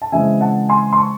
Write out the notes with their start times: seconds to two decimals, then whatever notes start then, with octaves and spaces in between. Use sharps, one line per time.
0.02 A5
0.12 C#3 E3 G#3 C4 E5 G#5
0.41 F#5 A5
0.69 G#5 C6
0.93 C6
0.98 A5 C#6